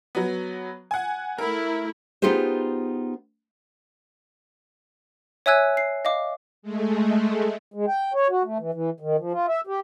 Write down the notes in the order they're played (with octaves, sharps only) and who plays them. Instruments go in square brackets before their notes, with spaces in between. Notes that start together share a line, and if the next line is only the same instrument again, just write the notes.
[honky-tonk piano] F#3 B3
F#5 G#5
[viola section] A3 E4 [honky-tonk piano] A#4
[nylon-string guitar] B3 D#4 F4 G4 G#4 C5
[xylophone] C#5 E5 G#5 E6 F#6 G#6
C7
D#5 F5 D6
[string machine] G#3 A3
[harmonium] G#3
G5
C#5
F#4
A3
E3
E3
D#3
F3
F4
E5
G4